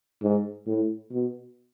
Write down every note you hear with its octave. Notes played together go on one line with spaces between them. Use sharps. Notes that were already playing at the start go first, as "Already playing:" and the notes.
G#2
A2
B2